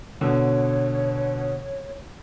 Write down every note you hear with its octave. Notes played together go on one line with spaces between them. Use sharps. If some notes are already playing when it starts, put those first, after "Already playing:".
B2 D3 C#5